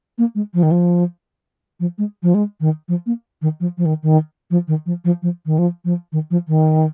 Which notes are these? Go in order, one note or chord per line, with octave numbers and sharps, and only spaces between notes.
A#3
G#3
F3
D#3
F3
F3
G#3
F3
G#3
D#3
F3
A#3
D#3
F3
F3
D#3
D#3
F3
D#3
F3
F3
F3
D#3
F3
F3
D#3
F3
D#3